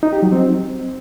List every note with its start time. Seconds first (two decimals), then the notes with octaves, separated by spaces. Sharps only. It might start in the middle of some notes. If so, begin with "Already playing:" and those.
0.03 D#4
0.13 G4
0.22 F#3
0.32 C4